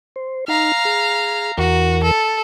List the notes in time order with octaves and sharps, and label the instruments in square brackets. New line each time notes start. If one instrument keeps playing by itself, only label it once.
[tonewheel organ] C5
[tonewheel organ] D#4 [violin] F5 A#5
[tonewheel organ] G#4
[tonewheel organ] E2 E3 A#4 [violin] F#4
[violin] A4